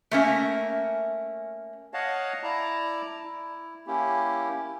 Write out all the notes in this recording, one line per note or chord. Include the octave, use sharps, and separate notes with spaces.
A3 A#3 C#4 E5
C#5 D#5 F5 F#5 A5
E4 D5 A5 A#5
E4
A#3 C#4 E4 G4